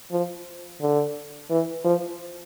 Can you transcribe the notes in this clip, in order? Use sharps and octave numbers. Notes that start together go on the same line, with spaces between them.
F3
D3
E3
F3